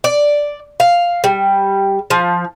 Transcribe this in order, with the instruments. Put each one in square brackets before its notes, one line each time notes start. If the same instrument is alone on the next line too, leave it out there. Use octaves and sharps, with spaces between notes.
[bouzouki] D5
F5
G3
F3